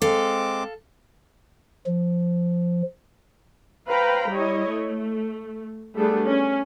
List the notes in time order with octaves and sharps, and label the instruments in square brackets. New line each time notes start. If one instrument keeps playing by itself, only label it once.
[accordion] G#3 C4 D6 [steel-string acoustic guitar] A4 F5
[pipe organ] F3
[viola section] B4 C5 F5 G5 A#5 B5
G3 E4 C#5 D#5
A3
G3 A3 B3 D4 G#4 A4
C#4